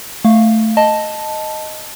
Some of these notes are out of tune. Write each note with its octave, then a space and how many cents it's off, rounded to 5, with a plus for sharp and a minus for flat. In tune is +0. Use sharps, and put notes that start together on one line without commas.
A3 +0 F5 +0
D#5 +0 A5 +0